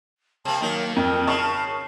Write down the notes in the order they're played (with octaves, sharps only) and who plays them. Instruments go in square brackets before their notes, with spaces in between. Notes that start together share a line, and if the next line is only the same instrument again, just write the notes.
[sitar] C3 A#3 [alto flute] A5
[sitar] D#3 F#3 [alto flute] A#3
[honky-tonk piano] F2 [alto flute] A#4
[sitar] C#3 [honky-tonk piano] A5 C#6 F6